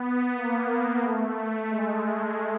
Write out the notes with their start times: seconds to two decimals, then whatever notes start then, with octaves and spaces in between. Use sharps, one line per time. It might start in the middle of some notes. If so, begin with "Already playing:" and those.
Already playing: B3
0.36 A#3
0.69 A#3
1.02 A3
1.69 G#3